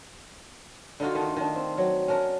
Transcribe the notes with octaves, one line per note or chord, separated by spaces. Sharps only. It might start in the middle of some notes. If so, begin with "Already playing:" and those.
D3 D#4 F4 F#4
D#3 A3 A#3 F4
D#3 D4
C4
F#3
C#4 D4 A#4